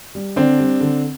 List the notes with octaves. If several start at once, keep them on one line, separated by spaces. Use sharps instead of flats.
G3
D3 C4 D4
G3
D3